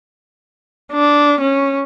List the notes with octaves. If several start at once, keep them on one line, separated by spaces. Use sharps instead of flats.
D4
C#4